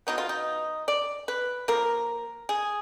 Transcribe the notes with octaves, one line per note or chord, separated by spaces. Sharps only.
B2 F#3 B3 D#4
F4
D#4
D5
B4
F3 A#3 A#4
G#4